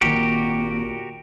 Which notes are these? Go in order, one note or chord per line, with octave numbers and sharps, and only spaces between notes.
G#1 D#2 A#2 A#3 F#4 G4 A#4